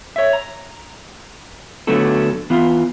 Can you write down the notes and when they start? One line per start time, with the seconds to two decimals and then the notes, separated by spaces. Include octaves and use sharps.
0.16 C#5 E5
0.33 A#5
1.87 D3 F#3 A3 B3 F#4 A4
2.50 E3 B3 F4